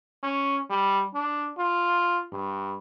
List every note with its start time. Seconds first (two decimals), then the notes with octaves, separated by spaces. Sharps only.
0.23 C#4
0.70 G3
1.15 D4
1.58 F4
2.32 G2